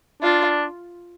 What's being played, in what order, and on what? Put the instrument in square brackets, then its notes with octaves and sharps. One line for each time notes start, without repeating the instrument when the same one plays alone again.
[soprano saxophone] D4 [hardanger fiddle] F4